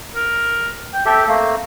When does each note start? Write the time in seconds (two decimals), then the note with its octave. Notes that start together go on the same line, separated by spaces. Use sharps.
0.15 A#4
0.93 G5
1.06 C4 G4 A4 E5
1.28 A3 A#3